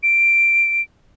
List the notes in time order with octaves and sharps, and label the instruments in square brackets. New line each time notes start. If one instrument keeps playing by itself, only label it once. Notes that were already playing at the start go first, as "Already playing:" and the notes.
[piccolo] D7